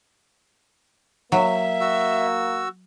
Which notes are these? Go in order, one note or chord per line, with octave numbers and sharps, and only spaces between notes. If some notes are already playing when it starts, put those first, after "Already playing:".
F#3 A#3 E5
F#4 E6